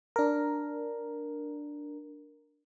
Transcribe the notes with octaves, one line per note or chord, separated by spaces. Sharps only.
D4 A#4